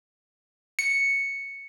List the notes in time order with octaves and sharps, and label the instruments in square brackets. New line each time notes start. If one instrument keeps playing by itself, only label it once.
[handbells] C#7